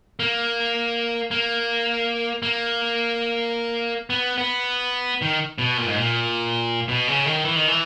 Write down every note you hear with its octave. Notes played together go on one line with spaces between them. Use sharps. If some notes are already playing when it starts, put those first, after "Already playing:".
A#3
A#3
A#3
B3
B3
D#3
B2
A#2
G#2
A#2
B2
C#3
D#3
E3
D#3
E3